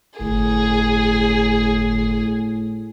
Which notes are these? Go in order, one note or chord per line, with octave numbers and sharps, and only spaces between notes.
G1 A2 G#4